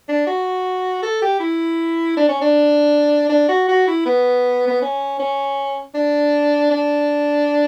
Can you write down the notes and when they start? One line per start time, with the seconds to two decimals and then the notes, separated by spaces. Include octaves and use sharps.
0.08 D4
0.27 F#4
1.03 A4
1.22 G4
1.40 E4
2.17 D4
2.28 C#4
2.41 D4
3.29 D4
3.48 F#4
3.68 F#4
3.87 E4
4.05 B3
4.68 B3
4.82 C#4
5.19 C#4
5.94 D4
6.71 D4